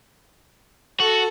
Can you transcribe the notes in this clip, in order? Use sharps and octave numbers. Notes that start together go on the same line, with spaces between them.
F#4 A4